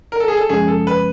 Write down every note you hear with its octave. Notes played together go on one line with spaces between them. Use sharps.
A#4
A4
G#4
A4
F#2 C#3 F3 G#3 C#4 G#4
A4
B4